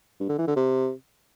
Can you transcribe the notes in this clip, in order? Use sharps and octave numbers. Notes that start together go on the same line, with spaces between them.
G2
D3
E3
D3
C3